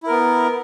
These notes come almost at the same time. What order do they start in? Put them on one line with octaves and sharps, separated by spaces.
E4 A#4 B3